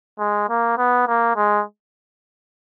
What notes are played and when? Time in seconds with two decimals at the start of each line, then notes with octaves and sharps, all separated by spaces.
0.19 G#3
0.49 A#3
0.78 B3
1.08 A#3
1.36 G#3